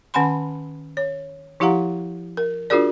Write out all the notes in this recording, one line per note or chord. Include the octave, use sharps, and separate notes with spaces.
D#3 C#4 F#5 G#5 B5 C6
C#5
F3 E4 G4 F5 F#5 A#5
A#4
D4 F4 F#4 G#4 A#4 D5